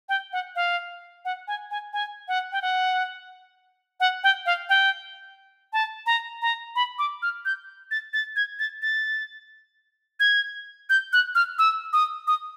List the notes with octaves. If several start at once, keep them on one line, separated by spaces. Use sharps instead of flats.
G5
F#5
F5
F#5
G#5
G#5
G#5
F#5
G5
F#5
F#5
G5
F5
G5
A5
A#5
A#5
B5
D6
F6
G6
A6
A6
G#6
A6
A6
G#6
G6
F#6
F6
E6
D#6
D#6